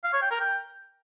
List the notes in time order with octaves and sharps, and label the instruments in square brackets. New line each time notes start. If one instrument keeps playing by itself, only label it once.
[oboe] F5
C#5
G5
A#4
G5